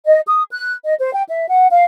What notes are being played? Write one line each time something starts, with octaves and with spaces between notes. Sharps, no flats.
D#5
D#6
F#6
D#5
C5
G5
E5
F#5
F5